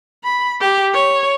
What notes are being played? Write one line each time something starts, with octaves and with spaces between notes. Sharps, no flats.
B5
G4
C#5